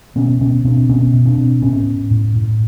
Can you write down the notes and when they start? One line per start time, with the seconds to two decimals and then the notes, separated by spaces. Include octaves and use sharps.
0.16 B2 B3 C#4
0.41 B2 B3 C#4
0.64 B2 C4 D4
0.89 B2 B3 C#4
1.13 B2
1.25 C4 D4
1.38 B2
1.62 A2 B3 C#4
1.87 A2
2.11 A2
2.35 A2